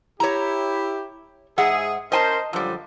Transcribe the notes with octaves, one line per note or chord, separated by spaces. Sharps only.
E4 G4 C#5 A#5
G#2 G#4 E5 F#5
C#4 A#4 C5 D#5 G#5 A5
F#2 D3 F3 G3